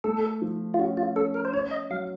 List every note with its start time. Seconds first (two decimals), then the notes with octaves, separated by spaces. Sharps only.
0.04 A3 A4
0.42 F3
0.74 F4
0.79 C#4 F#4
0.97 F4
1.16 C#4 A4
1.34 A#4
1.45 C5
1.53 C#4 C#5
1.71 D#5
1.90 F#3 F5